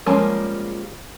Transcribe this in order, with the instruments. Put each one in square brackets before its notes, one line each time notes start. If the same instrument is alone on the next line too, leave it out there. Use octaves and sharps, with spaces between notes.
[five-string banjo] F3 G3 G#3 A#3 C#4